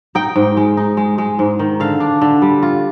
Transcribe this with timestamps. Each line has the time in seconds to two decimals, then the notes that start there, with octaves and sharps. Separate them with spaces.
0.15 D#4 G5
0.36 G#2
0.57 G#3
0.77 D#4
0.97 G#3
1.18 G#3
1.39 G#2
1.59 D#3
1.80 D3 F5
2.00 D4
2.22 D3
2.42 G3
2.63 F4